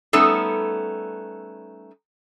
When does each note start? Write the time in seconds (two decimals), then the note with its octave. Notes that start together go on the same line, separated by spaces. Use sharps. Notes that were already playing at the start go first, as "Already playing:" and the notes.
0.13 G3 A3 B3 C#4 D#4 A4